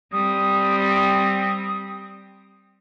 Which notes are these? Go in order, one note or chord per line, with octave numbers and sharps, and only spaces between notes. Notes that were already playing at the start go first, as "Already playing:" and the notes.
G3 C4 D#6